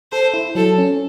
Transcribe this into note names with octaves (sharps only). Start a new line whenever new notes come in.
A4 C5
E4
F#3 A4
C#4